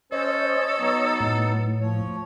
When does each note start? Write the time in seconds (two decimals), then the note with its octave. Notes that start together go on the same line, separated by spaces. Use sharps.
0.12 C#4 A4 C5 C#5 D#5
0.79 F#3 B3 D#4
1.20 A2
1.80 F3 C#5